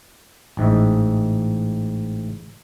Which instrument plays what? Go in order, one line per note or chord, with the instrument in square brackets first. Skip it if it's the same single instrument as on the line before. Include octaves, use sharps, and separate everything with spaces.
[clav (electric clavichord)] A1 G#2 D#5 E5